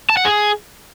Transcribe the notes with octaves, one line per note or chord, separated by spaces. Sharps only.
A5
F#5
G#4